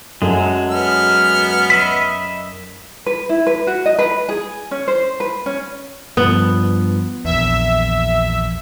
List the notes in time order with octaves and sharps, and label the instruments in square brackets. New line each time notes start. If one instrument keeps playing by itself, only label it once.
[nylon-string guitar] F#2 G#4 A4 [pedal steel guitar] F#3 G#3
[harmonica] B3 F6
[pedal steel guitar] D#5 E5 B5
[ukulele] B4
E4
B4
F#4
D#5
B4
G#4
C#4
C5
B4
C#4
[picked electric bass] G2 F3 [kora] B3
[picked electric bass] A#1 E2 [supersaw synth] E5